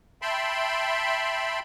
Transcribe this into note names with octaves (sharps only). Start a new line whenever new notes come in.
E5 G5 A5 B5 C6